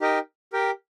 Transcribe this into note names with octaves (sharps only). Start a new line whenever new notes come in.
D#4 G4 A#4 D#5 G5
G4 A#4 G5